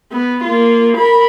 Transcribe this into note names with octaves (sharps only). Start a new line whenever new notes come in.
B3
A#3 F4
A#4 B5